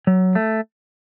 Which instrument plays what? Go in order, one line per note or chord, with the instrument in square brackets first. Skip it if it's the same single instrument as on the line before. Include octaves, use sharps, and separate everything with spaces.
[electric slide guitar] F#3
A3